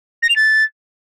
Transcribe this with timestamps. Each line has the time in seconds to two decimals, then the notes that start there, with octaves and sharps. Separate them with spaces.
0.23 A#6
0.29 F7
0.36 A6